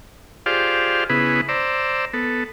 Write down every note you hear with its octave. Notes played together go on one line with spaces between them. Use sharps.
F4 G4 G#4 C5 D5 F5
C#3 B3 E4 G#4 B4
C5 D5 A#5 E6
B3 A4